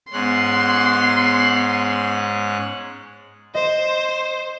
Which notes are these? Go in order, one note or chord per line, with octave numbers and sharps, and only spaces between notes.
G#2 B3 C#4 C6 F#6
C5 D#5